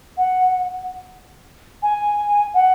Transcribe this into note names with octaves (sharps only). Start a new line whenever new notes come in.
F#5
G#5
F#5